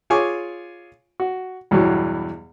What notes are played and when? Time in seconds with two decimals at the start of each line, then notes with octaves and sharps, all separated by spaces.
0.10 F4 G#4 C#5 G#5 C#6 D6
1.20 F#4
1.71 E2 G2 B2 E3 F#3